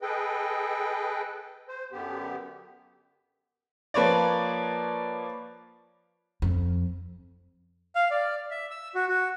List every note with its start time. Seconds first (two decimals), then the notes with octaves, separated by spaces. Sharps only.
0.02 G#4 A4 B4 D#5 G5
1.69 C5
1.92 F#2 D3 B3 G4
3.94 F3 A#3 B4 C#5 D5
6.42 F2
7.95 F5
8.11 D5
8.51 E5
8.71 E6
8.95 F#4
9.08 F#4